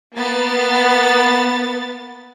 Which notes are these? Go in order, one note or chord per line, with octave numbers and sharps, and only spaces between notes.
A#3 B3 A6